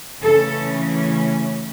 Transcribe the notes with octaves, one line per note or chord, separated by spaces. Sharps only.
C#3 E3 A3 C#4 A4